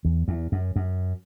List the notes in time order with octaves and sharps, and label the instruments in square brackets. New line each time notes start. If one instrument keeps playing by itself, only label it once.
[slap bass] E2
E2
F#2
F#2